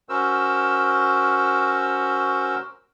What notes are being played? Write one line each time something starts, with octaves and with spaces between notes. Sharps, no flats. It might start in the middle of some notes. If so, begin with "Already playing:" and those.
C#4 F#4 A#4 C5 E6